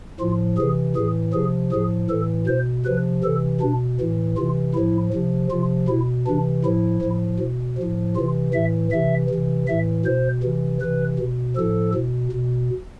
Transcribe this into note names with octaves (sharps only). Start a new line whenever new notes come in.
A2 F3 F4
C3 E3 G#4
A2 E3 G#4
C3 F3 G#4
A2 F3 G#4
A2 E3 A4
B2 C5
C3 F3 B4
C3 E3 A4
B2 D4
A2 E3
C3 E3 F4
A2 F3 E4
C3 F3
C3 F3 F4
B2 E4
C3 E3 D4
A2 F3 E4
A2 F3
B2
A2 F3
C3 E3 F4
A2 E3 E5
C3 E3 E5
C3 E3
A2 E3 E5
B2 C5
C3 E3
C3 E3 B4
B2
A2 F3 A4
B2
B2